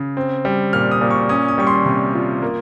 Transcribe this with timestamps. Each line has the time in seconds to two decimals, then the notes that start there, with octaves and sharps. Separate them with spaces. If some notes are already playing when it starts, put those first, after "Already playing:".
Already playing: C#3
0.17 C4
0.45 G3
0.73 A#2 F6
0.91 D#6
1.01 A#2
1.10 C#6
1.29 C#4 D#6
1.48 D#6
1.58 G3 C#6
1.67 C6
1.85 C3
2.14 F4
2.42 A#3